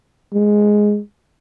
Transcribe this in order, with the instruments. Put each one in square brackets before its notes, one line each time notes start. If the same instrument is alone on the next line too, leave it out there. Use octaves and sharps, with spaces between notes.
[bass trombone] G#3